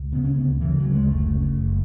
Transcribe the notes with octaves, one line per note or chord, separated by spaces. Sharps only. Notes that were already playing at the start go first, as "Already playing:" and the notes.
Already playing: C#2
C#3 B3
C#4
D2 B3
C#3 E3
F#3
D2
G#3
F#1 A3
C#3
F#1